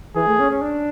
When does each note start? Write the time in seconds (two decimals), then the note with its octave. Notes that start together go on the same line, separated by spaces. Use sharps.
0.15 E3 G#4
0.27 A3
0.40 C#4
0.51 C#4
0.62 D4